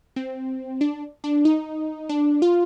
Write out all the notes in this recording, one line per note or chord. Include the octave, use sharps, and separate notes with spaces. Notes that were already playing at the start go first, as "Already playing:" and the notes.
C4
D4
D4
D#4
D4
F4